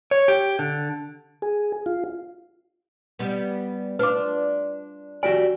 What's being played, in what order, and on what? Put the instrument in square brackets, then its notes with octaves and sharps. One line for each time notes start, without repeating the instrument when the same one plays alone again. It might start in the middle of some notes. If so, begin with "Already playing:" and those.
[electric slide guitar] C#5
G4
D3
[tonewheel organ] G#4
F4
[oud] G3 B3
[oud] D4 F4 [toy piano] B4 D6
[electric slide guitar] F#4 G4 D5 [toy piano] G#5